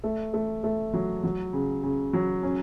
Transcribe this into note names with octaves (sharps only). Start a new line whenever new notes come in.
A3
A3
A3
F#3
F#3
C#3
C#3
F#3
C#4